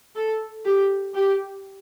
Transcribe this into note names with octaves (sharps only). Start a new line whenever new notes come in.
A4
G4
G4